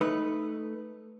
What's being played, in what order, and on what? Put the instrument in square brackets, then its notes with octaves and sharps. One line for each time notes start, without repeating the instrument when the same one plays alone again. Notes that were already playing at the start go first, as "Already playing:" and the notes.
[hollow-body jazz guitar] A3 D#4 B4